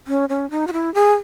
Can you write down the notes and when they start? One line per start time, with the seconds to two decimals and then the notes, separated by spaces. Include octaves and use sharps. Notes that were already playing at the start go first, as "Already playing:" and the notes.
0.07 C#4
0.29 C#4
0.51 D#4
0.67 F#4
0.73 E4
0.94 G#4